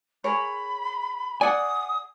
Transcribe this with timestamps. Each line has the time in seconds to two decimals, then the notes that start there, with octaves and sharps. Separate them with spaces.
0.24 G#4 A#4 C#5 B5
1.41 D5 F#5 G#5 D#6